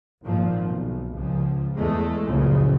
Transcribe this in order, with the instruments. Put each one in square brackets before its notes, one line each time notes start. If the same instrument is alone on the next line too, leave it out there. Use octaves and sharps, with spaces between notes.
[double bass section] G#1 A#2 F3
B1
C#2 F3
E2 G#3 A3
F#1 C#2 A#2 C#3 F3